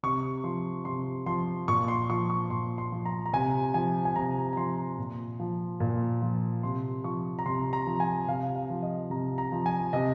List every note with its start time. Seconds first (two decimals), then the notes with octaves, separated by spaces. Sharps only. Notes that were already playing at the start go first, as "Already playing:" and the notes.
0.03 C3 C#6
0.44 F3 C6
0.85 C3 C6
1.26 F3 C6
1.68 A#2 C#6
1.88 C6
2.10 F3 C#6
2.30 C#6
2.50 A#2 C6
2.78 C6
2.92 F3
3.05 A#5
3.26 A#5
3.33 C3 G#5
3.74 F3 G#5
4.05 G#5
4.16 C3 A#5
4.53 A#5
4.57 F3 C6
4.98 A#2
5.40 F3
5.80 A#2
6.22 F3
6.63 C3 C6
7.04 F3 C#6
7.39 A#5
7.46 C3 C6
7.73 A#5
7.87 F3
8.00 G#5
8.28 C3 F5
8.56 F5
8.70 F3
8.83 D#5
9.10 C3 A#5
9.38 A#5
9.52 F3
9.66 G#5
9.93 C3 D#5